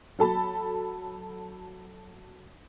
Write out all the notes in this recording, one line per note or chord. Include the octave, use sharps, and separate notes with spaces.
F#3 A4 A5 B5